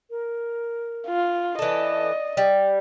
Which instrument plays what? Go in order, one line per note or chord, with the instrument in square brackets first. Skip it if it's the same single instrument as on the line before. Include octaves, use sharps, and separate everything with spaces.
[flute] A#4
[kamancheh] F4
[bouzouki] E3 A4 [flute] D5 [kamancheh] D#5
[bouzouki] G3